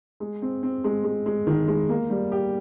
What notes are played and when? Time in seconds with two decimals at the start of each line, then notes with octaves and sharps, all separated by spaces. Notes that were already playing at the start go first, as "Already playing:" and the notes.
0.20 G#3
0.42 C4
0.63 C4
0.84 G#3
1.04 G#3
1.26 G#3
1.47 D#3
1.68 G#3
1.89 A#3
2.10 G3
2.32 G4